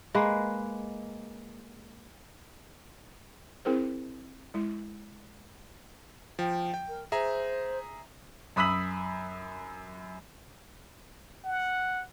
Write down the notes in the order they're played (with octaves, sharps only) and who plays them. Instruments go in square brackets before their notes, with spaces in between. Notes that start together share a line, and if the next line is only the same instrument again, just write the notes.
[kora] G#3 A#3 B4
[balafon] C4 E4 G#4 A#4 C5
G#3 E4
[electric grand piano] F3 [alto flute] G5
[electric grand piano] G5
[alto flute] A#4
[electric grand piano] G#4 E5 A#5 [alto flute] C5
[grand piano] F#2 B5 D#6 E6 B6 F#7
[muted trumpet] F#5